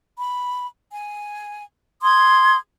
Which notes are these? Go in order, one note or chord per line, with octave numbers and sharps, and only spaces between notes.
B5
G#5
C6 D#6 G#6